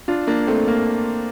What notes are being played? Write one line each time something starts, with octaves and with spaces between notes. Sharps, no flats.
D4 F4
A#3 D4
A3 C4
A#3